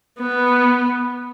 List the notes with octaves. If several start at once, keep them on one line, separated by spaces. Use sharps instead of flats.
B3